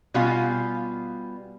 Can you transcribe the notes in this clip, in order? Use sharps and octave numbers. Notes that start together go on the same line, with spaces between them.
B2 G3 B3 F4 F5 G#5